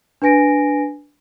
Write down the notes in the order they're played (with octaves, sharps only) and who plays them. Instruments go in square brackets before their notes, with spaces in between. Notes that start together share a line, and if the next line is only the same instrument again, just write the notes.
[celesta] D4 B4 G#5 A#6 D7